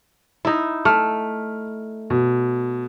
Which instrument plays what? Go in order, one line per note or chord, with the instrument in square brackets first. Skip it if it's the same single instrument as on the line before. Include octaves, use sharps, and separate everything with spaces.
[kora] D#4 E4
[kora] A3 [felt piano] F6
[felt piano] B2